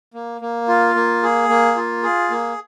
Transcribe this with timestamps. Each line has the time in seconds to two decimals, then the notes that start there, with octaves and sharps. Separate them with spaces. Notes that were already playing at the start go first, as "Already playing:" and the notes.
0.14 A#3
0.41 A#3
0.68 F4
0.95 A#3
1.23 G#4
1.49 A#3
1.76 F4
2.03 G#4
2.30 A#3